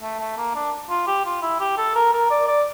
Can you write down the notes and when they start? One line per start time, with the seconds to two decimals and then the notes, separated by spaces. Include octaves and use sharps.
0.02 A3
0.19 A3
0.37 A#3
0.55 D4
0.90 F4
1.07 G4
1.25 F4
1.42 E4
1.60 G4
1.77 A4
1.95 A#4
2.13 A#4
2.30 D5
2.48 D5